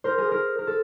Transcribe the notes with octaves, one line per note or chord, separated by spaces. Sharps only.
A#4 C5
G#4 A#4
G#4 A#4
A#4
A4